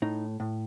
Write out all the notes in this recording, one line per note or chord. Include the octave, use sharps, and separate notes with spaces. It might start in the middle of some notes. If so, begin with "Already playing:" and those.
A2 D#4
A2